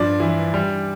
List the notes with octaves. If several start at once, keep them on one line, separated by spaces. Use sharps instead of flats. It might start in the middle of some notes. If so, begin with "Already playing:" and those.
Already playing: G2 F3 D5
E3
G3